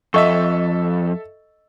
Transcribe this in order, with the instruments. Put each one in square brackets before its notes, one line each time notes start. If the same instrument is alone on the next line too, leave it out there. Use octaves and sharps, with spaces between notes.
[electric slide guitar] F2 [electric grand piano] A4 E5 [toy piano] D#5 C#6